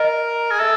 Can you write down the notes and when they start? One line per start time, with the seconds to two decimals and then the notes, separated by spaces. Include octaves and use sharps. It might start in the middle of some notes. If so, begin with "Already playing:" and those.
Already playing: A#4 D#5
0.51 G#4
0.60 A4 E5